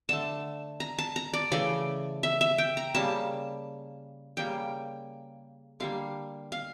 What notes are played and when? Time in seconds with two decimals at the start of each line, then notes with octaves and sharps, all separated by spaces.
0.09 D3 A3 A5
0.80 A#5
0.98 A5
1.16 A#5
1.33 D5
1.51 C#3 E3 A3 D5
2.23 E5
2.41 E5
2.58 G5
2.77 A#5
2.94 C#3 G3 A#3 A5
4.37 C#3 G3 A#3 G5
5.80 D3 G3 A#3 F5
6.52 F5